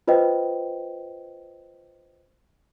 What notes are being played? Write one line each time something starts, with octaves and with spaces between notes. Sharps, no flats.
F4 B4 C5 D#5 G5